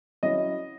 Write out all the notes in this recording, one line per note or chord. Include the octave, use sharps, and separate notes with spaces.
F#3 C#4 E4 D#5